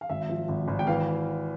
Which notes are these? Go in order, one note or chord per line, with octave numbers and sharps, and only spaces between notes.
F5
G#1 E5
F3
G#1
G#1
G5
E3 F5